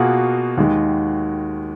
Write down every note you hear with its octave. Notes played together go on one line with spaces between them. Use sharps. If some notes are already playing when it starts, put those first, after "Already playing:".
Already playing: B2 A#3 F4 F#4 G#4
D#2 D#3 G#3